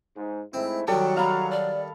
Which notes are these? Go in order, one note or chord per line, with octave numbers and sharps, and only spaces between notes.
G#2
G#2 A3 C4 E4
D#3 F#3 G3 A4 G5
F5 A#5 B5
D5